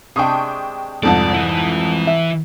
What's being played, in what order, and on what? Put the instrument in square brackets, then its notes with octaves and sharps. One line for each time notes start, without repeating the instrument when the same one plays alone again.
[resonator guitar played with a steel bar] C3 G#3 D4 [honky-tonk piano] G5 C#6 D#6
[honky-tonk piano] C2 F2 G#2 [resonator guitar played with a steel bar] A4 [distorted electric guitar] D5
[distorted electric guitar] E3 E4
[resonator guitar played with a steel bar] E5